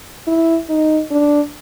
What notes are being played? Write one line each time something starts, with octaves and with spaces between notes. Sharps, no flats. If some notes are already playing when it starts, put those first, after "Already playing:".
E4
D#4
D4